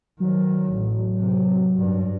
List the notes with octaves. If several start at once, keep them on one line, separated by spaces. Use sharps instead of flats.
D#3 F#3
A1
C3
G2